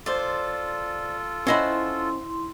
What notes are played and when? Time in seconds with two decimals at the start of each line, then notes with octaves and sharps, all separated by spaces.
0.06 F4 A4 C5 D5
1.47 C#4 E4 C5 D#5 E5 F#5 B5 C6